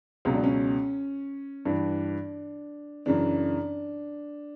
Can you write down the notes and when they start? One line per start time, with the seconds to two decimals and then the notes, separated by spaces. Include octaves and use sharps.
0.25 C#2 B2 F#3 C#4
0.34 D4
0.44 C#4
1.65 G2 E3 D4
3.06 F#2 C#3 E3 D4